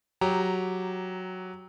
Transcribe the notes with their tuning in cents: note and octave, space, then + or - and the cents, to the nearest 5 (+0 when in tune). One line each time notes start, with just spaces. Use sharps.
F#3 +0 G4 +0 A#5 +0